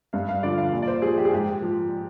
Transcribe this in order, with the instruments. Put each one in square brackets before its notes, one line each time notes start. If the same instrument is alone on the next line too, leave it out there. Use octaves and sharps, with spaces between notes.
[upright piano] G2 F5
F5
D3 F3 D5
F5
A#2
D5
C5
F3 G#4
G4
G#4
G#2 G4
F3